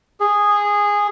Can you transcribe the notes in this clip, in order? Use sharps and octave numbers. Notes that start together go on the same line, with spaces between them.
G#4